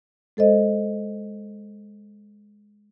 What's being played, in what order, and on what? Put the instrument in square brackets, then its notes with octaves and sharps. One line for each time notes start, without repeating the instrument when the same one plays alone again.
[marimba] G#3 A4 C5 D#5